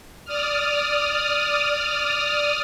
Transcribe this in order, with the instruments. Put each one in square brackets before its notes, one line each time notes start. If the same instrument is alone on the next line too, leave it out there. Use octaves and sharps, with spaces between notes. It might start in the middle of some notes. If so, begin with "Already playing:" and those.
[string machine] D5 D#6 F6